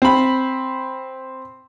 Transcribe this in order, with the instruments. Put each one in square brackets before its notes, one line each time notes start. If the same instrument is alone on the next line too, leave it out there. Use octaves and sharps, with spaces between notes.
[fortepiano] C4 B5